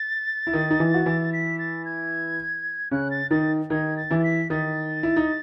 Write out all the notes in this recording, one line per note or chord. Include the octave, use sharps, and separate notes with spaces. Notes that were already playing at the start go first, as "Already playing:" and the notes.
Already playing: A6
E4
D#3 D#4
D#4
E3 E4
F#4
E3 E4
B6
A6
G#6
C#3 C#4 F#6
A6
D#3 D#4 A6
D#3 D#4 G#6
A6
E3 E4
A6
B6
D#3 D#4 A6
E4
D#4